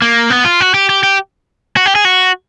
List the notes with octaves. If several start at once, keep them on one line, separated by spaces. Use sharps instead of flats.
A#3
B3
F4
F#4
G4
G4
G4
F#4
G4
G#4
F#4